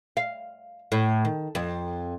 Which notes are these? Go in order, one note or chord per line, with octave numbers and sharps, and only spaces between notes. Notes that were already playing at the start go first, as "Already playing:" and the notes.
F5
A2
D#3
F2